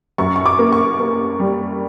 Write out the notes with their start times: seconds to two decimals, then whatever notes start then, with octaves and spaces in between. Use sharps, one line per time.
0.18 F#2 C#6
0.36 C#6
0.46 D6
0.59 A#3
0.72 C#6
1.00 A#3
1.40 G3